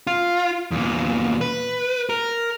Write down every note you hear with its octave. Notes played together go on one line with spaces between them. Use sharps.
F4
E2 A#2
B4
A#4